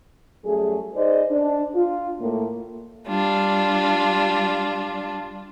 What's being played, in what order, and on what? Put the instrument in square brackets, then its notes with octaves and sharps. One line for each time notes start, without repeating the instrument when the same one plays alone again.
[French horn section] F#2 G3 A3 G#4
D#4 G#4 B4 C5 D5 D#5
D4
F4
A2 A#3
[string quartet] G3 D4 F4